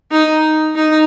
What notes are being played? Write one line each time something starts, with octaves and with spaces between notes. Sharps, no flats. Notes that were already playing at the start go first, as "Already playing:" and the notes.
D#4
D#4